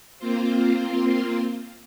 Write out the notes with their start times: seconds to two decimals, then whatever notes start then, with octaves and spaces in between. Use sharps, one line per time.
0.19 A#3 C4 F4 C5